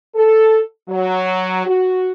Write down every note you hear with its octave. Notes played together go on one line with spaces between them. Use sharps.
A4
F#3
F#4